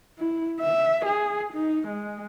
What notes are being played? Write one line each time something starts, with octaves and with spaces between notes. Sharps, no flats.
E4
E5
G#4
D#4
G#3